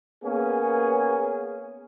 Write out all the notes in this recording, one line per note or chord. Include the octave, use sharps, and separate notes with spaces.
A#3 B3 C#4 G#4